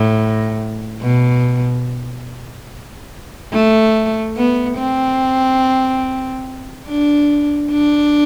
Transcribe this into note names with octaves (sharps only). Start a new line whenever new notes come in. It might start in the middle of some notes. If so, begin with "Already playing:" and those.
Already playing: A2
B2
A3
B3
C4
D4
D4